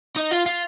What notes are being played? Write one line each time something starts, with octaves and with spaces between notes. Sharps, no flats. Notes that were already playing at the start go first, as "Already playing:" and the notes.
D#4
F4
F4